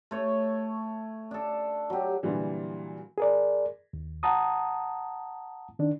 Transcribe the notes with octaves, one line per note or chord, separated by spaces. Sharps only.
A3 C#5
D4 A4
F#3 G4
A#2 D3 E3 F#3 G3
G#4 A#4 D5
D#2
F#5 A5 A#5 D#6
D#3 D4